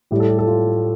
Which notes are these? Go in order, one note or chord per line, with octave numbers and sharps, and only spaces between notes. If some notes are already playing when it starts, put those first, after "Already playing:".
A2 G3 G4
A4
G4
A4
F4